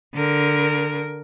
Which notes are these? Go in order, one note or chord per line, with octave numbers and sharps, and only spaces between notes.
D3 A#4